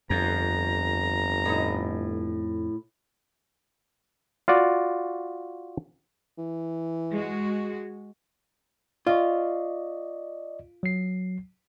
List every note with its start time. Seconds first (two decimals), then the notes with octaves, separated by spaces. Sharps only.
0.10 G1 F2 A#5
1.45 A2 D#4
4.48 F4 F#4 D5
6.38 E3
7.14 G#3 F#4
9.07 F4 D5 D#5 C#6
10.83 F#3 C7